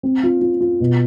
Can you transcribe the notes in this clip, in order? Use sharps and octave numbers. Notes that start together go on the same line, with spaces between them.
C4
F4
F4
F4
B2